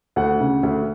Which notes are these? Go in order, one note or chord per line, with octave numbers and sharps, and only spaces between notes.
D2 F#5
C#3
D2